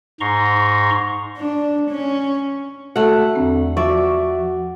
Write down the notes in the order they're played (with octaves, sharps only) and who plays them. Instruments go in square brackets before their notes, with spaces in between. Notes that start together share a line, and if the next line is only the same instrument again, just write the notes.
[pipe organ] G#2 A#5 C6 C#6
[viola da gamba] D4
C#4
[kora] A3 F#5 [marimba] F#4
[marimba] E2 C4 [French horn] D3
[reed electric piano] F3 E5 [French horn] F#4 [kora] D5 [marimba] C#6